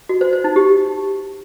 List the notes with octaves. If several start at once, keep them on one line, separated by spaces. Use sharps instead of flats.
F#4
C5
C5
D#4
G4